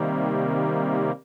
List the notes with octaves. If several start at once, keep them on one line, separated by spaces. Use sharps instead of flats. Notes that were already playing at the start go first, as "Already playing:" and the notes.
Already playing: C3 D#3 G3 A#3